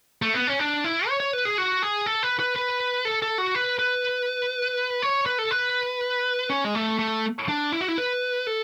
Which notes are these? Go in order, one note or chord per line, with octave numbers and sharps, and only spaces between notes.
A3
B3
C#4
D4
E4
C#5
C#5
B4
G#4
F#4
G#4
A4
B4
B4
B4
A4
A4
F#4
B4
B4
C#5
B4
A4
B4
C#4
G#3
A3
A3
D4
E4
F#4
E4
B4
A4